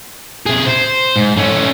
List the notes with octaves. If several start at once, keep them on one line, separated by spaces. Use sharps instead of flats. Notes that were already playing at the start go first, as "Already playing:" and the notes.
C3 G#4
C5
G#2
A3 C#4